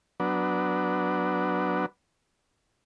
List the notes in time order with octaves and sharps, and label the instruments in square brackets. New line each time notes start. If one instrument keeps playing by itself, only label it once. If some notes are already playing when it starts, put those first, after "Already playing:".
[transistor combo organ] F#3 B3 D4